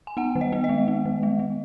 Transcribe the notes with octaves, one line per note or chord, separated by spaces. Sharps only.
G#5
B3 F#5
D#3
D#5
B3
D#5
G#3
B3
D#3
G#3
G#3